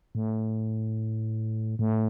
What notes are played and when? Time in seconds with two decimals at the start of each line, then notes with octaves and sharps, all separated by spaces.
0.15 A2
1.79 A2